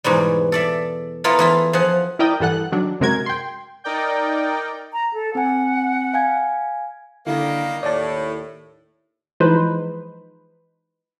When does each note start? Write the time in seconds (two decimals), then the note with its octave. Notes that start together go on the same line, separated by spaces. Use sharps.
0.04 E2 G#2 B2 G3
0.52 A4 D5 E5
1.24 B3 E4 F4 A4 A#4
1.39 E2 E4 F4
1.73 F3 G#4 F#5
2.19 E4 A#4 D5 G5 D#6
2.40 G2 E3 A4 F#5 F#6
2.72 D#3 F#3 D4
3.00 F#2 C3 G#3 F#4 A#4 G#6
3.26 G5 C6
3.84 D#4 A#4 D5 G5
4.93 A#5
5.13 A4
5.35 C4 F#5 G#5
6.14 F5 G#5 G#6
7.27 D3 D#3 G3 A#3 E4
7.83 D#2 A2 D5 A5
9.40 E3 F3 G#3 D#4 B4 C5